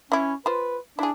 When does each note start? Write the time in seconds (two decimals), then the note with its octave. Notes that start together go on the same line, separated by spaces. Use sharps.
0.12 E3 C#4 E4
0.46 F4 B4 C5
0.99 D4 E4 G#4